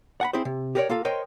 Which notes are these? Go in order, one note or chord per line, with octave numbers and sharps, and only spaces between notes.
F#5 G#5 B5
C4 E4 G#4 C5
C3
G4 G#4 A#4 B4 C#5 D5
A#3 F4 A4 F5
A#4 C5 C#5 D#5 G5 C6